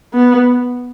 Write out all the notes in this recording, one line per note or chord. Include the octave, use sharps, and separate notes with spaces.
B3